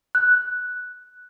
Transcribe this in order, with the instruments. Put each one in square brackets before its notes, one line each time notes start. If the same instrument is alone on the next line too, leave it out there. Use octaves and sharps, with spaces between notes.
[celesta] F#6